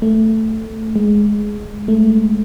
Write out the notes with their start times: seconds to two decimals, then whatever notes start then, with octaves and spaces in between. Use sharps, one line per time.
0.02 A3
0.96 G#3
1.88 A3